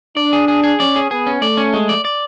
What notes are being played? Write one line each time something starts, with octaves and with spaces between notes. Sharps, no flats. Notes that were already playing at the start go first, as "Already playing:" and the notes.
D4 D5
G#4
G#4
G#4
C#4 D5
G#4
B3 G#4
C#4
A3 D5
C#4
G#3
D5
D5